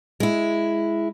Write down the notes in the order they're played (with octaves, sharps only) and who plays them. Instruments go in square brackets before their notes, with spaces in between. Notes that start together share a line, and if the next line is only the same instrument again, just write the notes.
[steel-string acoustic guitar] G#3 E4